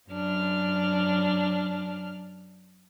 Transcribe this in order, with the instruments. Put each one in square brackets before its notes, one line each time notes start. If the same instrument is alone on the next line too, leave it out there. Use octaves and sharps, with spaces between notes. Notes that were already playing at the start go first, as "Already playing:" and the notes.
[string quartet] F#2 D4 F6